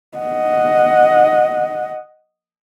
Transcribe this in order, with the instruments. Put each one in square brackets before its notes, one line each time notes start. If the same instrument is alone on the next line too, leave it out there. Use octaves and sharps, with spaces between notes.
[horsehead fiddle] D#5 F#5